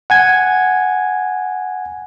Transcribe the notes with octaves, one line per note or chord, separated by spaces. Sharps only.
F#5 G#5 G#6